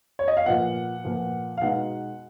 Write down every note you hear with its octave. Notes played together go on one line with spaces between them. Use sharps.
C#5
D#5
F5
A#2 F3 B3 F#5
A#2 F3 B3
F5
B2 G#3 B3 D#4 F#5